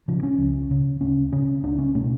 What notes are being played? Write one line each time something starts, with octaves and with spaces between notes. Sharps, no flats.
C#3 F3
C#4
C#2
C#3
D2 C#4
C#3 C#4
C#2 D4
C#4
B2 A3